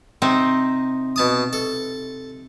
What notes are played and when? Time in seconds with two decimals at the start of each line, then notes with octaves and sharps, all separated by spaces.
0.22 C3 C4 D#4
1.16 B2 A5 D#6
1.53 A4